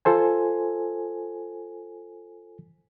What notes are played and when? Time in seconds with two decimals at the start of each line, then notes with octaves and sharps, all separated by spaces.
0.05 F4 A4 C5 G#5